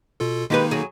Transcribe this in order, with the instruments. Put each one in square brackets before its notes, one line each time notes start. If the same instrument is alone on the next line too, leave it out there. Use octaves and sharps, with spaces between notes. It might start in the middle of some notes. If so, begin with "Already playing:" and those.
[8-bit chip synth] B2 F4 A4
[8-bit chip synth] D#3 A#3 D#4 [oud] G#3 G4 B4
[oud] F#3 G#4